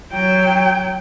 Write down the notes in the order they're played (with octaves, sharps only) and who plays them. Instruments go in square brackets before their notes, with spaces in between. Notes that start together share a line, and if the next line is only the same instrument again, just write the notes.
[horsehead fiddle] F#3 G5